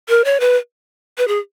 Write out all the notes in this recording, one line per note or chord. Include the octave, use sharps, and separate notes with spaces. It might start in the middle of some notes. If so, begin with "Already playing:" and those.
A#4
C#5
B4
B4
G#4